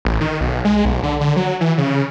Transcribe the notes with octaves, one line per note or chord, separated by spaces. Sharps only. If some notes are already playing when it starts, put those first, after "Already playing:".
A1
D#3
B1
G#3
B1
D3
D3
F#3
E3
C#3